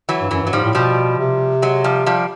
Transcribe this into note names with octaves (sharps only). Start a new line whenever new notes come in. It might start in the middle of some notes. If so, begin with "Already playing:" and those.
E3 F#3
G2
F#2 E3 F#3
G2 F#3
G#2 F3 G3
A2
B2 F3 G3
C3
F#3 G#3
F3 G3
F3 G3